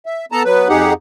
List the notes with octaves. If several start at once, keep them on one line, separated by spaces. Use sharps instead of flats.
E5
B3 A4 A5 A#5
F#3 B3 B4
F2 D#4 G4 G#4 F#5